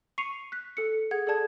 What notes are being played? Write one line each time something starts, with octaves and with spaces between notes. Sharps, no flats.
C#6 C7 C#7 D#7 F7
F#6 B6
A4 C#7
G#4 F#5 G#6
G#4 A4 D5 A5 G#6